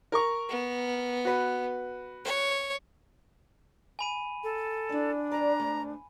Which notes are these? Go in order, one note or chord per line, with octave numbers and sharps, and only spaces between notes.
A#4 A#5 C#6
B3
F#4 B4
C#5
G#5 B5 D#7
A4
D4 E4 D5
E2 G2 D5 A#5
G#2 A3